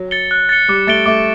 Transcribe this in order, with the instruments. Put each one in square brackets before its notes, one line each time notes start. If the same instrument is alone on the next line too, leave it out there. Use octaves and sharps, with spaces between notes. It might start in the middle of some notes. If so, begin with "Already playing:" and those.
Already playing: [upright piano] F#3
[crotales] A6 C#7 G7
F#6
A6 C#7 G7
[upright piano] G3 [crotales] D6
[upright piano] A3 [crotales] A6 D7 G7
[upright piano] A3 [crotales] D6